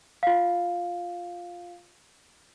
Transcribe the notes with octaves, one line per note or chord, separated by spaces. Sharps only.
F4 F5